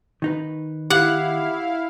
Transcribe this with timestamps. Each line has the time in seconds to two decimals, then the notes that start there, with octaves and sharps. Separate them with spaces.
0.22 D#3 D#4 B4
0.90 E4 G4 F5 F#5